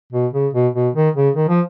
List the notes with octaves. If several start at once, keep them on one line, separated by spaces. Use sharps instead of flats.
B2
C#3
B2
B2
D#3
C#3
D#3
F3